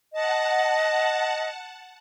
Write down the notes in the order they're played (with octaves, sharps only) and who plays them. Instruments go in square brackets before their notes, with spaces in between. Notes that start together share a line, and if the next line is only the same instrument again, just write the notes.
[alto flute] D#5 [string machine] F#5 A5